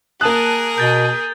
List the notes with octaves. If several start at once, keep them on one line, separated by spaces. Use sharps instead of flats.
A#3 G#4 A#4 A5 D#6 F#6 D#7
B2 G6 A6 G7